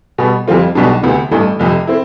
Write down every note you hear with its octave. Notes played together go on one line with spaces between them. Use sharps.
B2 G3 B3
F2 E3 G3 C4 F4
B1 B2 G3 B3 D4
D2 C3 E3 B3
A1 G2 E3 A3
F1 F2 C3
C4 E4